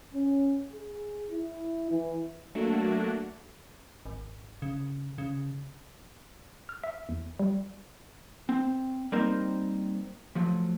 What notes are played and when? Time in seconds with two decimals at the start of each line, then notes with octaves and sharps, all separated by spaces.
0.14 C#4
0.74 G#4
1.30 E4
1.90 E3
2.55 F#3 A3 A#3 D4 F#4
4.06 G#1
4.62 C#3
5.18 C#3
6.69 F6
6.84 E5
7.09 E2
7.39 G3
8.49 C4
9.12 G3 A#3 C4 D#4 A#4 C5
10.35 F3 F#3 A3